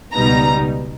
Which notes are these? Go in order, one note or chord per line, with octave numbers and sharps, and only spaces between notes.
C#2 B2 G3 B3 D#4 A#5